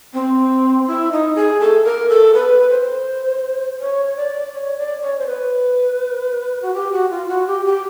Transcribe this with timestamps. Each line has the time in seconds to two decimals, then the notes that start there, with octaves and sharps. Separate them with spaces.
0.14 C4
0.88 E4
1.12 D#4
1.35 G#4
1.60 A4
1.84 A#4
2.09 A4
2.34 B4
2.70 C5
3.80 C#5
4.17 D5
4.53 C#5
4.78 D5
5.02 C#5
5.19 C5
5.27 B4
6.62 F#4
6.74 G4
6.93 F#4
7.10 F4
7.28 F#4
7.47 G4
7.65 G4